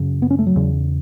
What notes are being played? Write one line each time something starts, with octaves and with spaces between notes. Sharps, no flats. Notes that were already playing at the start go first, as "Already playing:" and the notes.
Already playing: F#2 C#3
B3
C#4
A3
F#3
E2 C#3